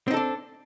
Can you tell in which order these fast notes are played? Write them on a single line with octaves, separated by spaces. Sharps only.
C4 D#4 A4 D4